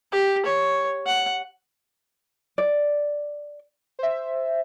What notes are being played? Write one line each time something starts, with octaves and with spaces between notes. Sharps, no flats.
G4
C#5
F#5
D5
C5 E5